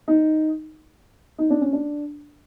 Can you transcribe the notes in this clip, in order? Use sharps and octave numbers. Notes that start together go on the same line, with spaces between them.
D#4
D#4
D4
C#4
D4